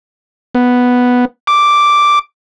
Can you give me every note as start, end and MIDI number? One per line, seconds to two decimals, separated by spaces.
0.55 1.25 59
1.47 2.19 86